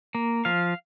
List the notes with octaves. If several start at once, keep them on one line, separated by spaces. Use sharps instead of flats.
A#3
F3 F5